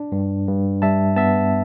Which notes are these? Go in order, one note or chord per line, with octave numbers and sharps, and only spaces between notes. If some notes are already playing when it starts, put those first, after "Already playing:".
Already playing: D4
G2
G2
G3 E5 A5
B3 E5 A5